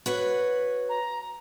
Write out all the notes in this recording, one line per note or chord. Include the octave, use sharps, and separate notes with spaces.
F#4 B4 C#5
A#5